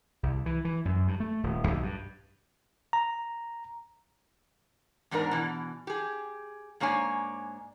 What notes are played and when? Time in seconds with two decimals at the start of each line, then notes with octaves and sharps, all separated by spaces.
0.23 C2
0.46 E3
0.65 E3
0.85 F#2
1.08 G2
1.20 A3
1.43 D#1
1.67 B1
1.83 G2
2.93 A#5
5.11 E2 G#2 D4 E4 A#4
5.31 B2 E3
5.87 G4 G#4
6.80 G#2 A#3 D4 C#5 G#5